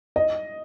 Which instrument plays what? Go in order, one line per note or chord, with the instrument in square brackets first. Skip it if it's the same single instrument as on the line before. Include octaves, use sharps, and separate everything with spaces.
[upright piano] D#5